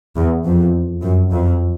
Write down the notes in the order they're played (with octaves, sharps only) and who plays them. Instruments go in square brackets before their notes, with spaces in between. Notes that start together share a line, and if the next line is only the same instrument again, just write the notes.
[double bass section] E2
F2
F#2
F2